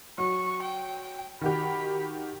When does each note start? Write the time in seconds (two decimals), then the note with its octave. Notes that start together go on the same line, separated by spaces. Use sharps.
0.18 F#3 C#6
0.62 G5
1.41 D#3 F#4 G4 B5